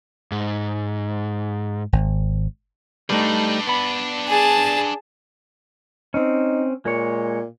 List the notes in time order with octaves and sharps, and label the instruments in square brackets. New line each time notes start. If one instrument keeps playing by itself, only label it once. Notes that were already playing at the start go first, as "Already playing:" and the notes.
[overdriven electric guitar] G#2
[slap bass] G#1
[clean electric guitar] G3 A3 D#4 [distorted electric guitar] D4 B4
[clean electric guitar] B3 B5
[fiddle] G#4 A5
[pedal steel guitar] C4 C#4 [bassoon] D#4
[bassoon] A#2 [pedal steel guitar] G#3 C#5